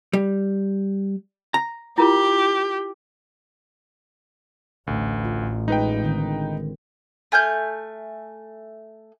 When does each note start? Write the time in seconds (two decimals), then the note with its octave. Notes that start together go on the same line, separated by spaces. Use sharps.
0.13 G3
1.54 A#5
1.98 E4 F4 G4 A#4
4.87 A1 D2
5.25 F4
5.68 G#3 D#4 B4 G5
6.04 D3 D#3 C4
7.32 A3 G#5 F6 G6